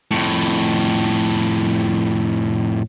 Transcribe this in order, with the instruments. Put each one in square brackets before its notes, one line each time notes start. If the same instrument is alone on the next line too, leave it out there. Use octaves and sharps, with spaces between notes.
[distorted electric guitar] F2 A2